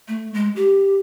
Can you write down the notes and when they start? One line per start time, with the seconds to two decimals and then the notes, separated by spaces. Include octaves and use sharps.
0.08 A3
0.34 G#3
0.56 G4